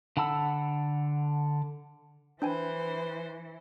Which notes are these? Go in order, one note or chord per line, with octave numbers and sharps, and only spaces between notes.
D3 F#5 A5 B5 E6
E3 D4 B4 C5 G5 G#5